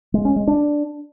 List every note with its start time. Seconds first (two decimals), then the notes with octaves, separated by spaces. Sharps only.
0.14 G#3
0.25 C#4
0.36 G#3
0.47 D4